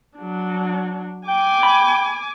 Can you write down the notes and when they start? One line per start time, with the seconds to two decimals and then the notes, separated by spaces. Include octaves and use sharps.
0.17 F#3 D4
1.28 G5 G#5 D6
1.63 B5